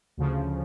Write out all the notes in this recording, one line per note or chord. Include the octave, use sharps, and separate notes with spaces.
D2 C#3 F3